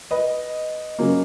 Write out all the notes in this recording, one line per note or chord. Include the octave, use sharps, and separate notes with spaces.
B4 D#5
C#3 F#3 A#3